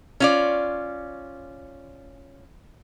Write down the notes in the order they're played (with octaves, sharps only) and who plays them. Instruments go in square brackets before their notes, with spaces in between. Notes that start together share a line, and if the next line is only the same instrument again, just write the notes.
[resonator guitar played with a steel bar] C#4 F4 D5